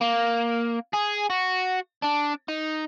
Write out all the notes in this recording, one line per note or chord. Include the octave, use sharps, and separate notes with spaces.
A#3
G#4
F#4
D4
D#4